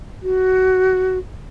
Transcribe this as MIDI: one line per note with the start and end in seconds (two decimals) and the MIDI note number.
0.23 1.18 66